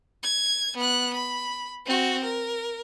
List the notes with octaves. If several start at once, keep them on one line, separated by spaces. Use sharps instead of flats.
G#6
B3 F#6
B5
C4 F#4
A#4